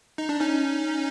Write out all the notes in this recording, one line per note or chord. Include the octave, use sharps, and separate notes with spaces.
D#4
D4
C#4 D#4